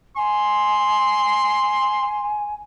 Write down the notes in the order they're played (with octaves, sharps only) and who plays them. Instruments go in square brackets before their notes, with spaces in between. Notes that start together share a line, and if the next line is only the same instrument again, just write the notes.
[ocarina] G#5 [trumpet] C6